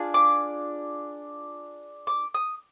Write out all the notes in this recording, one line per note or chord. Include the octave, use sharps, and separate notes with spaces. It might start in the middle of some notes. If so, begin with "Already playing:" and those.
Already playing: D4 F4 G#4
D6
D6
D#6